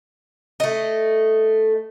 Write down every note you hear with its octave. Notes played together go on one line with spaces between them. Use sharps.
A3 D#5